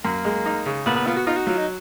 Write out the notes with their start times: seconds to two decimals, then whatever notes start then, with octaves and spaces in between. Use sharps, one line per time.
0.04 F#2 A#3
0.25 G#3
0.46 D#4
0.66 C#3
0.86 A#2 B3
0.96 B3
1.07 B3 F4
1.16 F#4
1.27 D#4 F4
1.37 F#4
1.47 F#3 F4
1.57 D#4